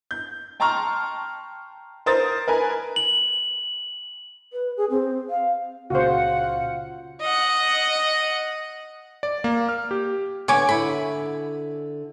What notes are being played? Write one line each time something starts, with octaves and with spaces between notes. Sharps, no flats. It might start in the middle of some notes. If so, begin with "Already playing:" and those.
G6
G5 A5 A#5 C6 C#6 F6
A#4 C5 D#6 A6
A#4 B4 G#5
F#7
B4
G#4
C4
F5
C#2 A#2 C#3 F4 F#4 C5 F#5
D#5 F#5
D5
A#3
F6
G4
D3 B3 C#5 G#5 D6
D3 E4 B5